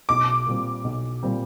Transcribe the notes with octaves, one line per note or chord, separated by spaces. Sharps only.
B1 D6
A#2 G3 C4
B1
A#2 G3 C4